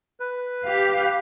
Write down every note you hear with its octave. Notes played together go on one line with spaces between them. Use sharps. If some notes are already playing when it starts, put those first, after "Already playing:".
B4
G4 F5